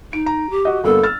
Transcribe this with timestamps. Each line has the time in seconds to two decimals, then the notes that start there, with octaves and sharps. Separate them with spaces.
0.13 D#4 D7
0.26 A#5
0.50 G4
0.65 F#4 D#5
0.84 G1 A#3 B3 A4
1.03 E6 F6 A6